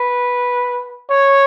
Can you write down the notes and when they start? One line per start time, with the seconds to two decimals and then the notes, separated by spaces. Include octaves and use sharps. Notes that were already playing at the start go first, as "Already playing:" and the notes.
Already playing: B4
1.10 C#5